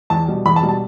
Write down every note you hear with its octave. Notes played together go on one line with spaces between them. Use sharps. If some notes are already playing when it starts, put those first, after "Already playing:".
E2 A5
B2 G3
E2 B5
A5
B2 G3
A5